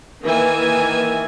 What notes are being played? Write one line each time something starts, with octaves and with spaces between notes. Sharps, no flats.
D#3 E3 A#3 E5 G#5